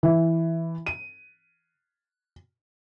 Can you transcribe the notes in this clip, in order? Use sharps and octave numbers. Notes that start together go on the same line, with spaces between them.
E3
D#7